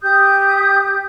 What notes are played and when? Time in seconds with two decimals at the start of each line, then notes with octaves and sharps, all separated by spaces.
0.01 G4 D#6 G6